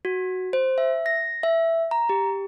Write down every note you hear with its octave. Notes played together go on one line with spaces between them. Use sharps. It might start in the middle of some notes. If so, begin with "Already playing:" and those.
F#4
C5
E5
A#6
E5
A#5
G4